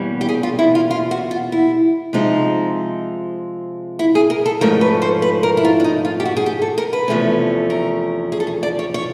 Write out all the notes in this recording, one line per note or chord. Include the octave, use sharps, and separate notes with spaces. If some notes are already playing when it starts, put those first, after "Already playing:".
Already playing: E2 B2 G3 A#3 C#4
G4
G#4
F4
E4
F4
F4
F#4
F4
E4
C3 F3 G#3 C4 D#4
E4
G#4
A#4
A4
G#2 F3 A3 C#4 A#4
B4
C5
B4
A#4
E4
F4
D4
D#4
F4
G4
F#4
G#4
G4
A4
A#4
B4
E2 C3 F3 A3 C#4
A#4
G#4
A4
G#4
D5
C#5
C#5